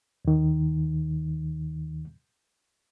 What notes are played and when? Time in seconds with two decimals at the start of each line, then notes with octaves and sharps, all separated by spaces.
0.25 D#2 D#3